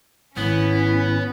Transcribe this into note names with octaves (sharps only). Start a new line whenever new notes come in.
G#1 B3 C#4 E4